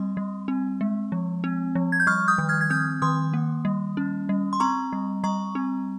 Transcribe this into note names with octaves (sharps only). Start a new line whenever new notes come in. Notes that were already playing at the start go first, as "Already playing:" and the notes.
Already playing: G3 C4 C6
G3
C4
G#3
F3
C4
F3
G#6
G6
G3 C#6 F6
D#6 G6
D#3
F6 G#6
G#6
C4 D#6 G6
D#3 C6 D#6
A#3
G3
C#4
G3
C6
C4 A#5 C#6
G3
G3 A#5 C#6
C4